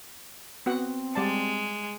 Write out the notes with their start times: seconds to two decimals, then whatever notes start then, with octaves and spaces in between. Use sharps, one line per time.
0.66 B3 C4 F#4 F#5
1.15 G3 G#3 D5 A5